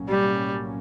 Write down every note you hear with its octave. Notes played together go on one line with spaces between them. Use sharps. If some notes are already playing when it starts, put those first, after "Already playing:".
Already playing: B1 A2 F#3 A#3 C#4
G3